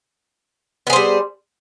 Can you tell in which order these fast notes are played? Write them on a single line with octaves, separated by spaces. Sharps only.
B3 G#4 C5 G3